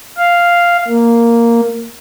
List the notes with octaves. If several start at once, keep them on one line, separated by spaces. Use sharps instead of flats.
F5
A#3